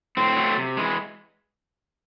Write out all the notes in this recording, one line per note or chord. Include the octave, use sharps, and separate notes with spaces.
A2 C4
F#3 A3
C3
E3 G#3